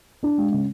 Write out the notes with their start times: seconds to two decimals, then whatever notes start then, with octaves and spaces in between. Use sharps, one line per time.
0.23 D4
0.38 G#3
0.52 C#3